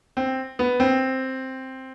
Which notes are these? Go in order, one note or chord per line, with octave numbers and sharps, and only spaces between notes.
C4
B3
C4